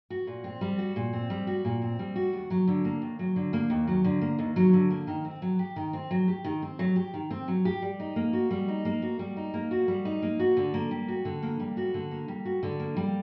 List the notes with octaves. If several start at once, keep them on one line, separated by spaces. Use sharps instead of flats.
F#4
A#2
C4
G3
F#4
A#2
C4
G3
F#4
A#2
C4
G3
F#4
D#2
F#3
D3
A#3
D#2
F#3
D3
A#3
D#2
F#3
D3
A#3
D#2
F#3
D3
A#3
D#3
C4
F#3
G4
D#3
C4
F#3
G4
D#3
C4
F#3
G4
D#3
C4
F#3
G4
G3
D#4
A#3
F#4
G3
D#4
A#3
F#4
G3
D#4
A#3
F#4
G3
D#4
A#3
F#4
D3
A#3
G3
F#4
D3
A#3
G3
F#4
D3
A#3
G3
F#4
D3
A#3
G3